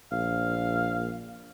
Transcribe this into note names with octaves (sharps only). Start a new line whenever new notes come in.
A#1 F5